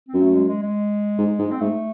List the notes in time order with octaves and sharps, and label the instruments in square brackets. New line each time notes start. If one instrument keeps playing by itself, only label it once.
[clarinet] C4
[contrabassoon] F#2
[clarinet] A3
G#3
G#3
G#3
[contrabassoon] G#2
G#2
[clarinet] C4
[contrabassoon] G#2 [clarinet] A3